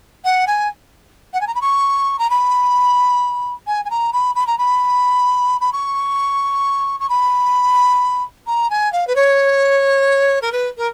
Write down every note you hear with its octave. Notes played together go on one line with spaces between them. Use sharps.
F#5
G#5
F#5
G#5
A#5
B5
C#6
A#5
B5
G#5
G#5
A#5
B5
B5
A#5
B5
B5
C#6
C#6
B5
A#5
G#5
F5
B4
C#5
A#4
B4
A#4